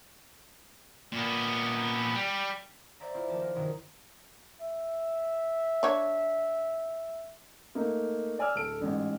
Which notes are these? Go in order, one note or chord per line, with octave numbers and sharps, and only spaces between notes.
A#2 B3
G3
C5 D5 E5 A#5
C4 E4 F4
D#2 F3 A5
A#4
F#2 C3 D#3 F3
E5
D4 C#5
A3 A#3 D#4
D5 G#5 E6 F6
D1 A4 D7
A1 G#2